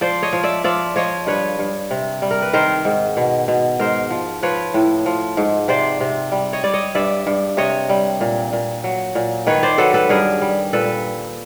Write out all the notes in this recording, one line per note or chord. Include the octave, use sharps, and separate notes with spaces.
F3 C5 D5
C#5 D#5
F3
D5 E5
F3 D5 E5
F3 C#5 D#5
G2 B4 C#5
G2
C3
G3
A#4
B4
D#3 A#4 C5
G#2
B2
B2
G#2 A#4 C5
F3
F3 B4 C#5
A2
F3
G#2
C3 C5 D5
C3
G3
C#5 D#5
G3 D5
C#5 D#5
G2 D5 E5
G2
C3 C#5 D#5
G3
A#2
A#2
F#3
A#2
D#3 B4 C#5
C5 D5
F#3 A4 B4
A4 B4
G2 G#4 A#4
G3
A#2 A4 B4